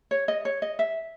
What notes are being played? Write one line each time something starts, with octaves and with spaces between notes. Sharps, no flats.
C#5
D#5
C#5
D#5
E5